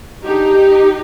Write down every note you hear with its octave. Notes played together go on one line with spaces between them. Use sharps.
D3 G#3 D4 D#4 G4